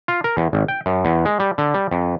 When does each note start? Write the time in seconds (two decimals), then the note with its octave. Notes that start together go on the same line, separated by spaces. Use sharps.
0.08 F4
0.24 A#4
0.37 E2
0.53 G#1
0.68 G5
0.86 F#2
1.05 E2
1.25 G#3
1.40 G3
1.58 D3
1.74 G3
1.91 F2